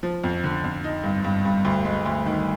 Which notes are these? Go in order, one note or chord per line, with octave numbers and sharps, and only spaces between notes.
F3
F2
D3
F2
D#4
G2
G2
G2
D2
G#3
D2
D#3